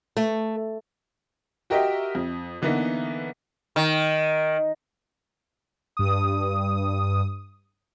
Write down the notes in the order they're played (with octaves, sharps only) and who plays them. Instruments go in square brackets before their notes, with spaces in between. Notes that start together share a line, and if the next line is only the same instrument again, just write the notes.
[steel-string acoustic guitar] A3
[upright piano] F#4 G4 A#4 D#5 E5 G5
F2
D3 E3 A#3 B3 D#4
[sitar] D#3
[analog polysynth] G2 D#6